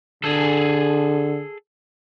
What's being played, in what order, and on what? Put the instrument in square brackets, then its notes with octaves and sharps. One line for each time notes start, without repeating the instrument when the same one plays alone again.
[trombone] D3 [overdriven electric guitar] G#4 A4